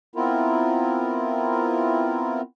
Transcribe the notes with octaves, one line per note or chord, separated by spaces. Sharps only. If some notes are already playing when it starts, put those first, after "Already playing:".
B3 C4 E4 F4 A#4